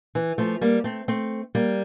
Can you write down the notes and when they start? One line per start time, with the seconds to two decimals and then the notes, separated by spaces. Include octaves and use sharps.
0.15 E3
0.38 F3 A3
0.61 G3 A#3
0.84 A3 C4
1.08 A3 C4
1.55 G3 A#3